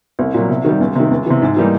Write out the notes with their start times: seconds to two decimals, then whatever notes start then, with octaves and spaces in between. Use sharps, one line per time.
0.19 C2
0.34 A#2 F#3
0.50 C3
0.65 D#3 G3
0.80 C#2
0.95 C3 D#3
1.11 C#2
1.26 C3 E3
1.42 G#2
1.57 E3 G3 A#3 D#4